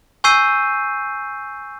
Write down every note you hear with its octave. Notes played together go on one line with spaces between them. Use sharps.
G#5 C#6 E6 G6 C7 D#7